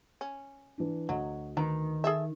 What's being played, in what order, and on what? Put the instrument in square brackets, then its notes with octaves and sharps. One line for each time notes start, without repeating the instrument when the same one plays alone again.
[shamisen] C#4
[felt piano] E3 D4
[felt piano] D2 D#5 [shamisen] F#3
[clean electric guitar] D#3 [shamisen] B4 A#5
[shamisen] G#4 A4 E5